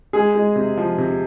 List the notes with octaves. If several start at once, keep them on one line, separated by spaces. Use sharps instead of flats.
G#3 G#4
G#3
C3
F3
C3